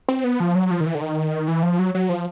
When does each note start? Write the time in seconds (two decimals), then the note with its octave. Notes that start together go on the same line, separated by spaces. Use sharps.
0.08 C4
0.24 B3
0.40 F3
0.55 F#3
0.71 F3
0.80 D#3
0.86 E3
0.95 D3
1.01 D#3
1.48 E3
1.63 F3
1.79 F#3
1.95 F#3
2.09 F3